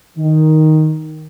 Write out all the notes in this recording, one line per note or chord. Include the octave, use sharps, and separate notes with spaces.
D#3